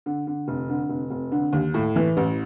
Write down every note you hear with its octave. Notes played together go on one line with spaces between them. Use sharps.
D3
D3
F1
D3
F1
F1
D3
D#2
A2
E3
A1